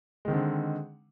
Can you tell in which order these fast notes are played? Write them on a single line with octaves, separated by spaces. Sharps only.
G#3 D#3 C4 D3